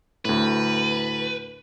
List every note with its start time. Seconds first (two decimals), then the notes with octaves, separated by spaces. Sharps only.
0.25 D2 A2 B4